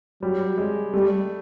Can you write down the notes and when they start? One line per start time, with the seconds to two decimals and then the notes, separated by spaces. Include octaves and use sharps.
0.22 F#3 G3
0.58 G#3
0.94 G3 A3